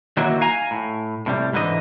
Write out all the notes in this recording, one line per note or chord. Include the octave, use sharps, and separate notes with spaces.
D#3 F#3 A#3 E4 F#4
F5 G#5 A#5
A2
A2 C3 G3
G#2 D3 E3 D#5